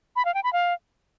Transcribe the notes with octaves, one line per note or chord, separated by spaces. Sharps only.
B5
F5
G5
B5
F5